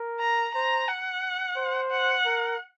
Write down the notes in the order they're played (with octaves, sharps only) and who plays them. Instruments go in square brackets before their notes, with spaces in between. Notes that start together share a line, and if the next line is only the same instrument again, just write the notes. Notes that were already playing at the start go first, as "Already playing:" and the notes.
Already playing: [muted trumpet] A#4
[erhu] A#5
[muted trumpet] C5 [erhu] A#5
[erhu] F#5
[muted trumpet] C5
[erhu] F#5
[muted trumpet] A#4